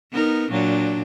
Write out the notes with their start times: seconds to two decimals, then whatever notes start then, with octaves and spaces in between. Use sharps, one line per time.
0.11 B3 D#4 A#4
0.51 A#2 F#3 D4